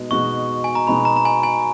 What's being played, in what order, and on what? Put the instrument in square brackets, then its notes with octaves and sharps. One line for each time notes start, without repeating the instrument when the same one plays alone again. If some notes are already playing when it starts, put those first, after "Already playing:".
Already playing: [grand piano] B2 G#3 D#4
[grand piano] B2 G#3 D#4 F#4 [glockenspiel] C#6
[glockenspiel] G#5
A#5
[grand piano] B2 G#3 D#4 F#4 [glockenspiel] B5
[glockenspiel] A#5
A#5
G#5
G#5